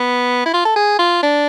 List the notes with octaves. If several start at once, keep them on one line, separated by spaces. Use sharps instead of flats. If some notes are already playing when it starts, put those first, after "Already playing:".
Already playing: B3
E4
F4
A4
G#4
F4
D4